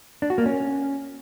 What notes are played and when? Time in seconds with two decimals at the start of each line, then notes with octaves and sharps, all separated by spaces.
0.22 D4
0.30 F#4
0.38 A#3
0.46 C#4